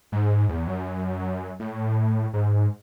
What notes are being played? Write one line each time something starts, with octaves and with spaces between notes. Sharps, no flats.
G#2
E2
F#2
A2
G#2